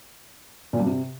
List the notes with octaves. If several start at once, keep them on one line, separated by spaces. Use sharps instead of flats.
A#2
G2
C3